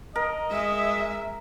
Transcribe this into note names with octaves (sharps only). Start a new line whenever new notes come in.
A#4 D#5
G#3 E5